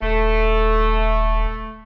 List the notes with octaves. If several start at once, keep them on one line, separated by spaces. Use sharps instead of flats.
D#1 A3